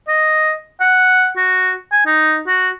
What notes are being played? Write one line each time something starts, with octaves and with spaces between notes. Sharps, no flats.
D#5
F#5
F#4
G#5
D#4
F#4